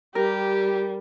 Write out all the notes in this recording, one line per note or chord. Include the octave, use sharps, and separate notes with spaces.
G3 G4 A#4